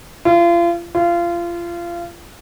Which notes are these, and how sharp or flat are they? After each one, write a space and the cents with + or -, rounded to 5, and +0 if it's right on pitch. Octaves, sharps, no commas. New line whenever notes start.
F4 -35
F4 -25